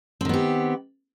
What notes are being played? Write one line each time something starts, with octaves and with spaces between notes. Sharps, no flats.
D#3 B3 C4 G4